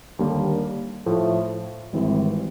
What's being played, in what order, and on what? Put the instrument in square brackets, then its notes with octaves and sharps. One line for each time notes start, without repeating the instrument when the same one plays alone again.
[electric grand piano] D#2 D3 G3 A#3
A2 F3 A3
G#1 G#2 E3 G3 C4